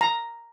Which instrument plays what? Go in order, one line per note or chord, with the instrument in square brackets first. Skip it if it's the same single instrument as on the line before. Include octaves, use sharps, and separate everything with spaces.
[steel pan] A#5